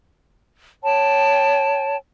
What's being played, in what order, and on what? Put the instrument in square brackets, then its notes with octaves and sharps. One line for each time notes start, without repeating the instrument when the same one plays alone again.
[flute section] C#5 G5 A5